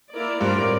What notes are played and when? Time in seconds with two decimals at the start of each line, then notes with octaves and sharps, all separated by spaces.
0.13 A#3 E4 A#4 D5
0.41 G2 C4 F4 A#4 D5
0.55 A2